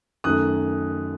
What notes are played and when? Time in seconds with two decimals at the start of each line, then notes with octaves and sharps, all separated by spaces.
0.24 F#2 D#3 A3 D#6 F#6